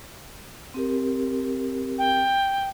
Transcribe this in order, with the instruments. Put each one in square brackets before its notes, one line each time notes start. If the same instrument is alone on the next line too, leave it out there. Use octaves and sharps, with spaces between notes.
[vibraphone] C4 G4 A#4
[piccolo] G5